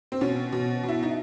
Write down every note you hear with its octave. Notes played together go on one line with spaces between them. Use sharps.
C4
B2 C#4
B2
B2
E4
D#4